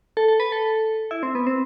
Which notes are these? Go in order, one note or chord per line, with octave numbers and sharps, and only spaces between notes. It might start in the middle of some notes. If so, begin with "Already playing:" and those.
A4
A4
B4
A4
E4
C4
B3
C4